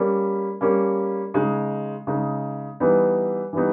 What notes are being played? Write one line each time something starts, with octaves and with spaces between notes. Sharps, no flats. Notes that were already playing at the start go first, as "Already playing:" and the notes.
Already playing: G3 A#3 C#4
G3 A#3 C#4
C#3 G#3 D#4
C#3 G#3 D#4
E3 G3 B3 D#4
E3 G3 B3 D#4